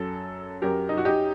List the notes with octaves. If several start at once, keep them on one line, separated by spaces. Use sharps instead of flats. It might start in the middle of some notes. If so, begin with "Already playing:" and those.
Already playing: F#2 F#3 A4
F#2 F#3 G4 A#4
D#4
F#4
D#4 G4